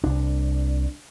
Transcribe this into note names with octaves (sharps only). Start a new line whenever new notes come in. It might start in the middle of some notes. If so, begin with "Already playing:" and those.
C2 D4